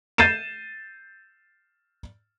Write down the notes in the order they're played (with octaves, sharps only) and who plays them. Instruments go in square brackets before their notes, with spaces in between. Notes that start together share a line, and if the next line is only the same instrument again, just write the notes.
[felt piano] G6 A6 C7 D#7 E7